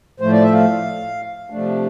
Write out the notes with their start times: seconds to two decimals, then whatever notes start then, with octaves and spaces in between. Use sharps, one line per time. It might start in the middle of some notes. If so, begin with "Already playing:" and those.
0.20 A2 F3 A3 C5
0.31 D5
0.42 E5
0.53 F5
1.50 C3 F3 A3 D4